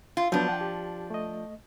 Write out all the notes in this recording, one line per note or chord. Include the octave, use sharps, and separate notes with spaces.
F4
F3 F#3 B3 D4
F#5 G5
G4
A3 D#5